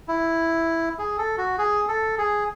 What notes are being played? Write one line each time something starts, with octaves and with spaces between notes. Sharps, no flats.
E4
G#4
A4
F#4
G#4
A4
G#4